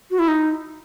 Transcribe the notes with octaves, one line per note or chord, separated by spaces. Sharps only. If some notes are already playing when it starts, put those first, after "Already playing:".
F#4
E4
D#4